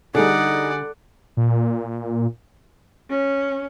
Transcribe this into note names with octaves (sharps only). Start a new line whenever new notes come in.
D3 G3 D#4 G#4 D5 F#5
A#2
C#4